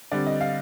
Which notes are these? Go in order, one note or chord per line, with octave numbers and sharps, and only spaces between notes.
D3 G3 C4 D5
D#5
F5